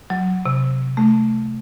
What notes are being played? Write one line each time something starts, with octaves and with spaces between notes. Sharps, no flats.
F#3
C3
A3